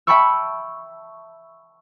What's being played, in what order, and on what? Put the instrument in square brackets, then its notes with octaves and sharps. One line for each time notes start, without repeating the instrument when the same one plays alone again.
[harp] E5 G5 A5 B5 C#6 E6